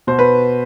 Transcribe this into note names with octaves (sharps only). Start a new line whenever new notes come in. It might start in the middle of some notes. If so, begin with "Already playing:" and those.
B2 C5
B4